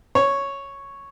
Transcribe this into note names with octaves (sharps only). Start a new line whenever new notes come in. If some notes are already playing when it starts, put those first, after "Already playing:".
C#5